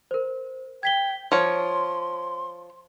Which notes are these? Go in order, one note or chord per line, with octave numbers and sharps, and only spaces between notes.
A#4 C5
G5 G#6 B6 G7
F3 C#5 C6 F6